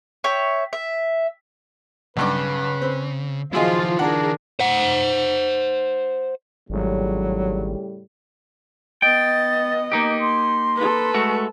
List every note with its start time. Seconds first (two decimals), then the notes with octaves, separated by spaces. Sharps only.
0.24 C#5 E5 G5
0.73 E5
2.17 B1 G2 C#3 B4 D6
2.81 C4
3.53 D#3 F3 F#3 E4 F4 G#4 D#5
3.99 D4 G#4 A#4 F#5
4.60 C5 F#5
6.70 G#1 A2 C#3 F#3 G3
9.02 B3 D#5 G5 A6
9.92 A#3 D#4 G4
10.20 C6
10.77 A4 B4
11.14 G#3 A3 F#4